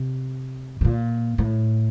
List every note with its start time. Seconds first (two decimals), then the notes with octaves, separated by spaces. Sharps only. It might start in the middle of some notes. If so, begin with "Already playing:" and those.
Already playing: C3
0.81 A2
0.85 A#2
1.38 A2